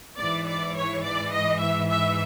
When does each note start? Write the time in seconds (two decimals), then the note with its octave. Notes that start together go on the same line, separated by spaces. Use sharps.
0.19 G#2 E3 D5
0.48 D5
0.77 C#5
1.04 D5
1.33 D#5
1.61 E5
1.90 E5